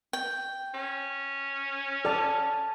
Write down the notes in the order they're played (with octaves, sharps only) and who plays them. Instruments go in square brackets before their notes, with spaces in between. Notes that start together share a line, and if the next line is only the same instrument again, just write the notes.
[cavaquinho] G5
[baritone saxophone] C#4
[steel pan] A4 D5 G5 [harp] A5 F6